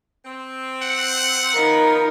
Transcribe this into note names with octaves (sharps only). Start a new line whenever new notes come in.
C4
F#5
D#3 F3 B3 D#4 A#4